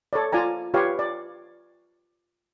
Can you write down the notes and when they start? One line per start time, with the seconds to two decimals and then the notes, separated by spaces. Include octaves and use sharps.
0.13 A4 C#5 D5
0.32 F4 D5 G#5 A#5
0.74 F4 G4 B4 C#5 F5
0.99 D5